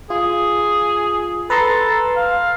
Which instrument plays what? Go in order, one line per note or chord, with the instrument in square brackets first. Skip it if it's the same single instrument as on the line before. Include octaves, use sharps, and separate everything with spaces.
[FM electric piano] F4 [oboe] G#4
[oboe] A4 [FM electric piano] B4 A#5 C6
[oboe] F5